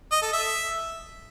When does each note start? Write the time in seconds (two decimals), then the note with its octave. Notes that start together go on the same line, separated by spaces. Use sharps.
0.12 D#5
0.22 A4
0.33 E5